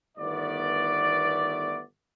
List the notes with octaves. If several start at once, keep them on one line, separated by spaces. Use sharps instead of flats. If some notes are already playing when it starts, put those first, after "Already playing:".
G1 D#3 A3 B3 D5